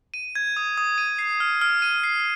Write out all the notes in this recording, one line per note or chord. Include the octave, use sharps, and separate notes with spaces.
D#7
G#6
D#6
D#6
D#7
C7
F6
F6
D#7
C7